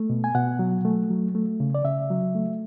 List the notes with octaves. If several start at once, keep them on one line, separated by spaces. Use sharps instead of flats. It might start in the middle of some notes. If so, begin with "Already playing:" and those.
Already playing: A3
B2
G#5
B2 F#5
F#3
A3
F#3
A3
C#3
D5
C#3 E5
F#3
A3